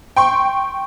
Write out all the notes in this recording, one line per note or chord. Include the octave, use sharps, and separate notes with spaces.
G5 C6 C#6